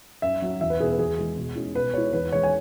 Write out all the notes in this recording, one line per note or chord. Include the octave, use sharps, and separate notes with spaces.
F#2 E5
F#3 C#4
E2 E5
B4
B2 B3 E4 G#4
B4
E2 G#4
E3 G#3
B2
G#3 C#4 E4
B2 B4
G#3 E4 C#5
E2 B4
E3 G#3 C#5
G#5